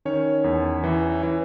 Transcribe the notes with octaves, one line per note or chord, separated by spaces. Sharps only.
D#3 C#4 C#5
E2
E3
E3